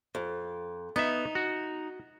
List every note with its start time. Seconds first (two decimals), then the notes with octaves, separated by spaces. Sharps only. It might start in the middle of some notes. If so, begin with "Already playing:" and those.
0.15 F2
0.96 B3 D#4 E5
1.35 F#4